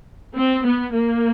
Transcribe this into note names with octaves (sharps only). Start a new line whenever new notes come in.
C4
B3
A#3